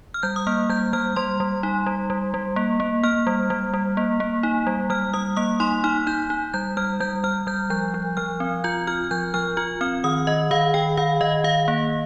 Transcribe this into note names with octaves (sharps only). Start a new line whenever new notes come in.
F6
G3 G6
D#6
A#3 F6
G3 G6
G3 F6
G3 C6
G3
D#4
G3
G3
G3
A#3
A#3
A#3 F6
G3
G3
G3
A#3
A#3
D#4
G3
G3 F6
G3 D#6
A#3 D#6
D#4 C6
D#4 F6
D#4 G6
D#4
G3 G6
G3 F6
G3 G6
G3 F6
G3 G6
F3 G6
F3
F3 F6
C4
F4 G6
F4 F6
F3 G6
F3 F6
F4 F6
C4 F6
D#3 D#6
D#3 D#5
D#3 F5
D#3 G5
D#3 F5
D#3 D#5
D#3 F5
A#3